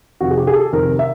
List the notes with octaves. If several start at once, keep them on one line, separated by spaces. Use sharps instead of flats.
F2 C3 D#3 F#4
G#4
G4
G#4
A4
F2 C3 D#3 A#4
E5